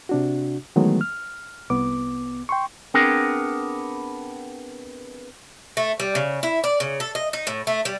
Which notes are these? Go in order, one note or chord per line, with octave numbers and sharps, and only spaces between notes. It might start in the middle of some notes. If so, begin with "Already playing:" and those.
C3 D4 F#4
D#3 E3 F#3 G#3 A3 B3
F6
C2 B3 D6
G5 C6 C#6
B3 C4 D4 G#4 A#4
A3
G3
C#3
E4
D5
C#3
A4
D#5
D#4
A2
A3
G3